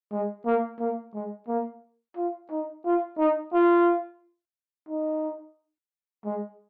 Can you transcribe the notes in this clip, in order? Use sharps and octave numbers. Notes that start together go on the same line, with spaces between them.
G#3
A#3
A#3
G#3
A#3
F4
D#4
F4
D#4
F4
D#4
G#3